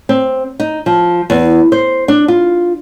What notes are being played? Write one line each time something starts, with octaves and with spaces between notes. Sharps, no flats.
C4
D#4
F3
E2
C5
D4
F4